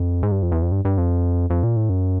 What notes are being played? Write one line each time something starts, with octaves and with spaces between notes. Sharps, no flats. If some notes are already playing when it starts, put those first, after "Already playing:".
Already playing: F2
G#2
G2
F2
E2
F2
G2
G2
F2
F2
A#2
A2
F#2